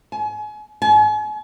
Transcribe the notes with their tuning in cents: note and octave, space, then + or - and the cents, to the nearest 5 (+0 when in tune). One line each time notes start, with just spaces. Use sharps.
G#5 +35
G#5 +40